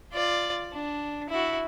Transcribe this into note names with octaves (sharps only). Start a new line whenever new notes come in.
F4 D5
D4
E4 F#4